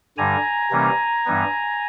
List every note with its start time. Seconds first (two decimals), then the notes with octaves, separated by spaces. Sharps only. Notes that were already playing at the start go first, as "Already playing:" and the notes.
0.17 G2 D3 G3 G#5 A#5
0.71 C3 E3 G3 A#3 C#4
1.25 G2 E3 G3 B3